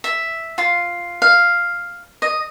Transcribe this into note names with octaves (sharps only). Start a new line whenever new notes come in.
E5
F4
F5
D#5